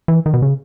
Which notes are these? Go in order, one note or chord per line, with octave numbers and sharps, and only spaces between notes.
E3
D#3
B2
C#3